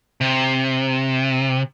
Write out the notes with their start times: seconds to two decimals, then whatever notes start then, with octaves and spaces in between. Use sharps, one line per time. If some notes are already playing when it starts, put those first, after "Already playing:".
0.21 C3